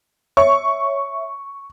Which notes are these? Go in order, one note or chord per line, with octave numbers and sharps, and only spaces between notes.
C#5 E5 C#6